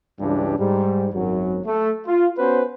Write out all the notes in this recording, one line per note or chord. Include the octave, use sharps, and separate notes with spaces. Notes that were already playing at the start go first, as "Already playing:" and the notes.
C#2 G2 E3 G3 D4 G4
G#2 G3
G#1 F#2 F#3
A3
F4
B3 C#4 F#4 B4 C5